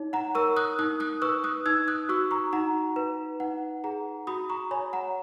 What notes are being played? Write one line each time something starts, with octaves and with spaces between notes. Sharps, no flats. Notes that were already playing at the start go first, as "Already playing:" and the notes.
Already playing: D#4 C#5
F#5 A#5
A#4 C#6 E6
D#6 F#6
D#4 D#6 F#6
D#6 F#6
B4 C#6 E6
D#6 F#6
D#4 E6 G#6
D#6 F#6
F#4 C#6 E6
A#5 C#6
D#4 F#5 A#5
B4
D#4 F#5
G#4 F#5 A#5
F#4 B5 D#6
A#5 C#6
C#5 G#5 B5
F#5 A#5